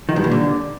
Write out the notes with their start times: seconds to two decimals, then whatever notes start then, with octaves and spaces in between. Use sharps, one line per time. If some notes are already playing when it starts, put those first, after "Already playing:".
0.09 D#3
0.16 G2
0.24 A#2
0.31 D3